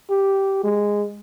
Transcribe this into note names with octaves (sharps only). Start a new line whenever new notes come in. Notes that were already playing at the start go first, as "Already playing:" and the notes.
G4
G#3